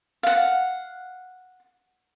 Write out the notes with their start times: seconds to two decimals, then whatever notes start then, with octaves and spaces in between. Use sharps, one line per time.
0.23 F5 F#5